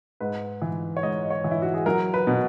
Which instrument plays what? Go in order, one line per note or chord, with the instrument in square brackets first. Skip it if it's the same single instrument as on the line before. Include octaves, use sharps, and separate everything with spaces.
[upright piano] G#2 B4
E3
C#5
G#2 D#5
C#5
E3
E4
F#4
G#4
F#3 A#4
B4
B2